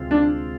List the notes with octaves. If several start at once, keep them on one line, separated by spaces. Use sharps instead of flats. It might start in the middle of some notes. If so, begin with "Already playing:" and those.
Already playing: D2 C3 G#3 C4 F4
D4